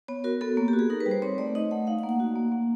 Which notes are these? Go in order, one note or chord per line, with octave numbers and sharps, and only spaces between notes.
B3 C#5
F#4 A#4
B3 A4
A#3
G4
F#4
G#4
D#4 A#4
B4
G3
C5
C4 C#5
A3 D5
D#4 D#5
A3 F#5
D#4 F5
F#5
A#3
F#5
F#4
A#3
A#3